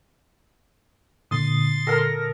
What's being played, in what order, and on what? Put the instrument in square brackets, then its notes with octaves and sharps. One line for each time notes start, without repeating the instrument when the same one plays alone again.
[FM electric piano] A#2 D3 D#6 [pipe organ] C6 A6
[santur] A4 A#4 [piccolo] A#6